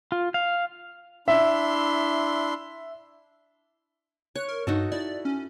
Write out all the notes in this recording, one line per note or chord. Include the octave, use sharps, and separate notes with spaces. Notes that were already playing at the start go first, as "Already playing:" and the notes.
F4
F5
D4 E4 E5 C6
C#5 F#6
A#4
G2 D#4 F#4 A4
E4 D5
C#4